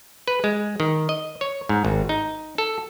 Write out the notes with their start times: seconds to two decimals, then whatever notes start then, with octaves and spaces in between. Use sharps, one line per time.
0.28 B4
0.44 G#3
0.80 D#3
1.09 D#5
1.41 C#5
1.69 G#2
1.85 G#1
2.09 D#4
2.58 A4